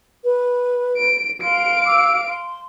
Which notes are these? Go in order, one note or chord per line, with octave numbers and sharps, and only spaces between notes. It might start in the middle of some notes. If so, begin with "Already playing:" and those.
B4
D7
F5 C6 D7
D6 E6
C6